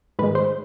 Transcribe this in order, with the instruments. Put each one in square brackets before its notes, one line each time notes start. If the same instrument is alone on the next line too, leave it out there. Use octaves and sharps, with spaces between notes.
[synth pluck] G#2 D#3 G#3 B4
C5